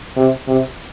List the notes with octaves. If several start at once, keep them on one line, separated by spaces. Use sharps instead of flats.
C3
C3